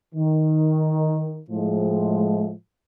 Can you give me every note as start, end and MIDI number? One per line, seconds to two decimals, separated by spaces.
0.15 1.41 51
1.50 2.53 45
1.50 2.53 53
1.50 2.53 56